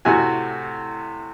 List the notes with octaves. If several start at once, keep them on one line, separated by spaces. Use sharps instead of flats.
A2 C3 A3 F#4 G#5